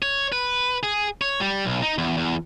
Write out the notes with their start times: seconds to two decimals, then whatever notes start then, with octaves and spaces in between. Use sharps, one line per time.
0.02 C#5
0.32 B4
0.83 G#4
1.21 C#5
1.40 G3
1.66 B1
1.82 D#4
1.98 E2
2.18 E2